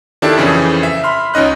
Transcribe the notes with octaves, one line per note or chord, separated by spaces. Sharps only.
D#3 D4 E4 G4 A4
F2 C#3 E3 G#4
E5
B5 C6 F6
C#2 C#4 D#4 D#5 F#6